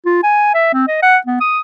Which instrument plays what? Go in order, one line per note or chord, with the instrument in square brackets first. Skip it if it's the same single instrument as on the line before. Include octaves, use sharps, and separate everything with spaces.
[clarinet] F4
G#5
E5
C4
D#5
F#5
B3
D#6